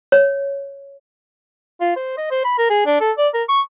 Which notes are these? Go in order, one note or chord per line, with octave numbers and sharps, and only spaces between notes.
C#5
F4
C5
D#5
C5
B5
A#4
G#4
D4
A4
D5
A#4
C#6